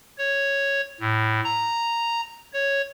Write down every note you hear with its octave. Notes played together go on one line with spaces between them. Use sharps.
C#5
A2
A#5
C#5